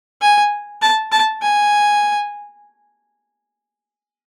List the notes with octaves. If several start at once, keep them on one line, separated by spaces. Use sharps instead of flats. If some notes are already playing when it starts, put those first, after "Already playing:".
G#5
A5
A5
G#5